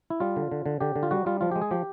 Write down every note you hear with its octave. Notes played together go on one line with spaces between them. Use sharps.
E4
G3 F4
D3
D3
D3
D3 G4
D3
F4
G3 F#4
G3 F4
F3 F4
G4
G#3
G#4
F3 G4